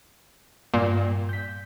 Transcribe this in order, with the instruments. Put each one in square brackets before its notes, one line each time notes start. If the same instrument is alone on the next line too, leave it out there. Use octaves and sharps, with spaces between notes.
[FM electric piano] G2 [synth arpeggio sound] A#2
[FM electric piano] G6 B6